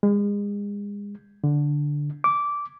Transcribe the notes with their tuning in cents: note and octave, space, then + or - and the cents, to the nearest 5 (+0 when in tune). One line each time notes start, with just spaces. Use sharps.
G#3 -35
D3 -5
D6 -15